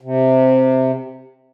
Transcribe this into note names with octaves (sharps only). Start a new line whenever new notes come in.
C3